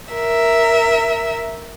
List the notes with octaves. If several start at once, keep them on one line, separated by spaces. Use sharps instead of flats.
A#4 E5